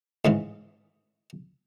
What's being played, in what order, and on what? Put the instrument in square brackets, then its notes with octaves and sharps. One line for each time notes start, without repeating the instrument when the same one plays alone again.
[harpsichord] G#2 C#3 E3